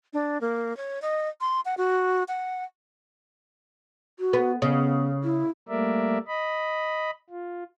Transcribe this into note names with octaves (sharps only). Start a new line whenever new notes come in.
D4
A#3
C#5
D#5
C6
F#5
F#4
F#5
F#4
B3
C#3 B3
E4
G3 A3 A#3 A#4 D5 E5
D#5 B5
F4